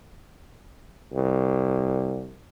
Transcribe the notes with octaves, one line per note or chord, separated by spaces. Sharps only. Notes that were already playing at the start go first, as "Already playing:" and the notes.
C2